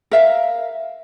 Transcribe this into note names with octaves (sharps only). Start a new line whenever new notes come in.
A#4 E5 F5